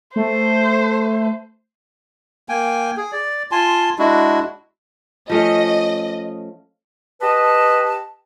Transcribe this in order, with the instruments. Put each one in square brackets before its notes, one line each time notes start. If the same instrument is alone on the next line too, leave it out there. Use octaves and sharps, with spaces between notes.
[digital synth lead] A3 [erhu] C5
[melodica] A#3 G5 G#5
G#4
D5
F4 G#5 A5 C6
G#3 D4 E4 F#4
[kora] F3 A3 C#4 [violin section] D#5
[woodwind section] G4 B4 D#5 A5